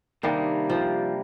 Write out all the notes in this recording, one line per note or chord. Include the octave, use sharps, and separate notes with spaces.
C3 D#3 G3 A#3 D4
F3